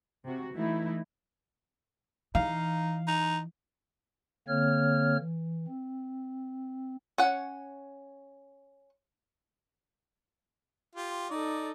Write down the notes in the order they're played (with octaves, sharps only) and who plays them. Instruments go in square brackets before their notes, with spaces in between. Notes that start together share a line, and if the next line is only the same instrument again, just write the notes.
[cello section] C3 F#4
E3 A3 D#4 E4
[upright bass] E3 [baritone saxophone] D#4 [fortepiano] F5
[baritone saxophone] D#4
[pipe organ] D3 A#3 C4 C#5 F6
E3
C4
[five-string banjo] C#4 F#5
[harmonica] F4 G4
[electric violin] D#4 A4 [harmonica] D5